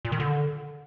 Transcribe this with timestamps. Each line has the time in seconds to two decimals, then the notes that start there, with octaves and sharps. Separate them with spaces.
0.05 A#2
0.12 D#3
0.20 D3